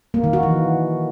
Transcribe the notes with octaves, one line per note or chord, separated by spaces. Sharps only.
A#3
D#3
F#4
E3